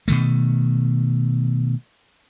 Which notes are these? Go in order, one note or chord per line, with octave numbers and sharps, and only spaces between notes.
B2 D#3 A3